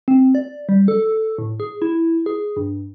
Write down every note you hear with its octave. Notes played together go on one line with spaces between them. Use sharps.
C4
D5
G3
A4
A2
G#4
E4
G#4
G2